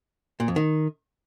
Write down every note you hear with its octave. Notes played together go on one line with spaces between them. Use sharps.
A#2
F2
D#3